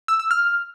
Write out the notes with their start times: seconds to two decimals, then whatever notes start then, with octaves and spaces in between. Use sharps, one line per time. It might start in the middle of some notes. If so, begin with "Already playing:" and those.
0.08 E6
0.19 E6
0.31 F6